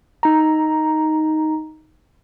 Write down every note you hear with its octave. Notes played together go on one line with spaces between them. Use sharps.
D#4 A#5